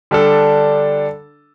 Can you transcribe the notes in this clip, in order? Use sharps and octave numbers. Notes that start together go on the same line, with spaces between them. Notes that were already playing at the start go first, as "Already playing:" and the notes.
D3 G3 D4 A4